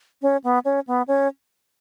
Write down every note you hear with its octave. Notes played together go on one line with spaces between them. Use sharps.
C#4
B3
C#4
B3
C#4